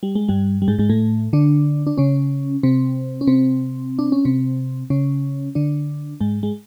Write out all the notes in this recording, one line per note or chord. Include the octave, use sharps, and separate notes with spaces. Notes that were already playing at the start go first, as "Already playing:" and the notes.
G3
G#3
G2 G3
G3
G#2 G#3
G#2 G#3
A2 A3
D3 D4
D4
C#3 C#4
C3 C4
C#4
C3 C4
D4
C#4
C3 C4
C#3 C#4
D3 D4
G#2 G#3
G#3